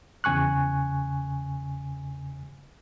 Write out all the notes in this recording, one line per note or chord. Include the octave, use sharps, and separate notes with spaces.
E2 C#3 G#5 C#6 F#6